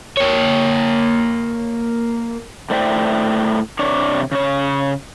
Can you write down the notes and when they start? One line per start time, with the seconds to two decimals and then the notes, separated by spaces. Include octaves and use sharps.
0.17 A#3 C#5
2.70 A2 A3 C5 D5 E5 G5
3.79 C3 D4 C#5 D5
4.32 C#3 C#5